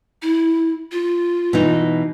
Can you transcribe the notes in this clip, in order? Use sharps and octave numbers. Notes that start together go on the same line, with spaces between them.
E4
F4
B2 E3 D#4